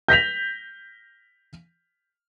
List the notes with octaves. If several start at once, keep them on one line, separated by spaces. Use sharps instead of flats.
G6 A#6 B6 F7